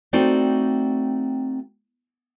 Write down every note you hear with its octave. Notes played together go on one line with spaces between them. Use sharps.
A3 C4 D#4 F#4 D5 G5